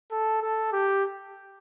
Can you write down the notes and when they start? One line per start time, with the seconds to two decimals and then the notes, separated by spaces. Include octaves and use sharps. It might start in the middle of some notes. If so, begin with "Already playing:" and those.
0.12 A4
0.42 A4
0.72 G4